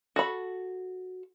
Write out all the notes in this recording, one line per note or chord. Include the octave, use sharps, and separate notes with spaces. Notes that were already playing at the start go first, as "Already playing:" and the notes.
F#4 A4 B5